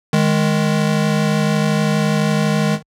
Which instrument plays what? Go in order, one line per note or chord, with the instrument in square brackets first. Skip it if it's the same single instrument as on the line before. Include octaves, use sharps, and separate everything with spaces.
[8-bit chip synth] D#3 G#3